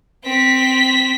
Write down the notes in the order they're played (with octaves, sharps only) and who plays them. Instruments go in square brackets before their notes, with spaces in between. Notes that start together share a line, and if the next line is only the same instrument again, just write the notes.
[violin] C4 B6